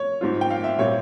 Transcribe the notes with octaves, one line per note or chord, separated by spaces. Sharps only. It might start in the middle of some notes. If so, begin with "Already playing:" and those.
Already playing: C#5
G#2 G3 C4 F4
G5
F5
E5
A#2 G3 C4 E4 C#5